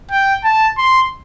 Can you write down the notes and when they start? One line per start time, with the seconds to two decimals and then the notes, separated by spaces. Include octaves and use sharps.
0.11 G5
0.44 A5
0.78 C6